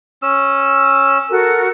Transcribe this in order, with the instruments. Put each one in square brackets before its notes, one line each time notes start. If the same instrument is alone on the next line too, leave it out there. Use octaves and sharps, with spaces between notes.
[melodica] C#4 E6
[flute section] F#4 A4 A#4